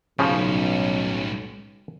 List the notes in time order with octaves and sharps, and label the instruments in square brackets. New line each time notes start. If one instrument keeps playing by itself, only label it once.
[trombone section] B1 [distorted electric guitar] A2 G3 [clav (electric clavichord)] C#3 F3 [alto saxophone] C#4